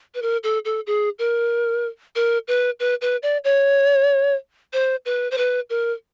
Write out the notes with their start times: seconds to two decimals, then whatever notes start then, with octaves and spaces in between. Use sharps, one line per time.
0.15 B4
0.22 A#4
0.43 A4
0.65 A4
0.87 G#4
1.19 A#4
2.16 A#4
2.48 B4
2.80 B4
3.02 B4
3.23 D5
3.44 C#5
4.73 C5
5.06 B4
5.31 C5
5.38 B4
5.70 A#4